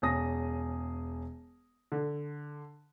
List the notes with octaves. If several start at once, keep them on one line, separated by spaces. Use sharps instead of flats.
E1 C#4 G#4 D#6 A#6
D3